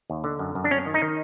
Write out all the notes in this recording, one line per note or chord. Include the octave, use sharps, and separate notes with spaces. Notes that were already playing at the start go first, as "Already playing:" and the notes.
D#2
D3
F#2
F#2
D4
F#2 C#4
D#3
D#4
D#3